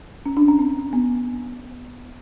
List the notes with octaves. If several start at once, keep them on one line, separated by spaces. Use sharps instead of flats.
C#4
D4
C#4
C4
B3